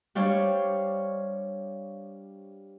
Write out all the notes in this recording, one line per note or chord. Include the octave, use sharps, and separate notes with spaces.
G3 D4 C5 C#5 F5